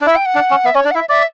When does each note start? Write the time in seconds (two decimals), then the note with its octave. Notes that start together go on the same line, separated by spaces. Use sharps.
0.01 D4
0.06 E4 E5
0.16 G5
0.26 F#5
0.35 D4
0.51 C#4
0.65 B3 E5
0.75 C#4 C#5
0.85 D4 D5
0.91 F#5
0.95 E4 E5
1.09 D5 E5